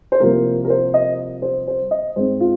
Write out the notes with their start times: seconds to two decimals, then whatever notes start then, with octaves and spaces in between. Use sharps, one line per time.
0.12 C5
0.20 C2 C3 F3 A#3 A#4
0.65 A#4
0.70 C5
0.94 D#5
1.42 C5
1.68 C5
1.91 D#5
2.16 G#2 G#3 C4 C5
2.41 F4